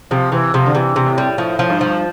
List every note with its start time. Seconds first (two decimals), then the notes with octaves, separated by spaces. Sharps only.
0.11 C3 F3
0.32 C3 E3
0.54 C3 F3
0.66 D3
0.74 C3 E3
0.96 C3
1.06 A2
1.18 G3
1.38 A2 F3
1.59 F3
1.70 G2
1.81 F3